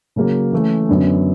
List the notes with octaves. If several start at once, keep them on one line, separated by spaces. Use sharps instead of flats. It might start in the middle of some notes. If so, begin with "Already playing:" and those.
C#3 F#3 A#3
E3 A3 C#4
F#2 D3 F#3 B3